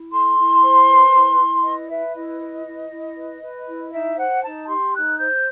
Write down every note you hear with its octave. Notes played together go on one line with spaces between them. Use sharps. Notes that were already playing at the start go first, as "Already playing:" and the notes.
Already playing: E4
A4 C6
E4
C5
B4
E4
E4
B4 D#5
B4 E5
E4 D#5
B4
E4
E4
B4
B4
E4
D#4 E5
C5 F#5
D#4 A5
G4 C6
D#4 F#6
C5 G6